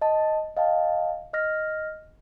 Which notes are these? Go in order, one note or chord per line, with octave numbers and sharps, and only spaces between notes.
D#5 A5
D#5 F5 G5 A5
D#5 F6 A#6